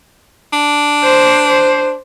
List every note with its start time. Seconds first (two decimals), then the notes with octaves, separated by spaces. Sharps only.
0.53 D4
1.03 C5
1.47 C5